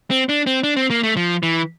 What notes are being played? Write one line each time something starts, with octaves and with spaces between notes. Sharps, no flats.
C4
D4
C4
D4
C4
A#3
A3
F3
E3